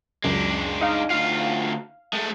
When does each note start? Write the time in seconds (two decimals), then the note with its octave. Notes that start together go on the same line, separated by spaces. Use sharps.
0.24 C#2 F#2 G#3 D4
0.81 D#4 F5
1.10 D2 F4 F5
2.13 G#3 A3